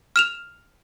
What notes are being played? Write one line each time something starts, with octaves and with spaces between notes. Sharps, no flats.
F6 E7 F7